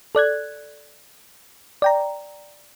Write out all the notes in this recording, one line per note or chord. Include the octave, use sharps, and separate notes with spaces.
A4 D5 F#6 G#6
D5 G5 A#5